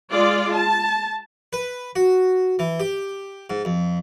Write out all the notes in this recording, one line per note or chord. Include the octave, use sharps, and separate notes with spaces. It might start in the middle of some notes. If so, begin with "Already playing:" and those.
G#3 F4 D5
A5
B4
F#4
E3
G4
G#2
F2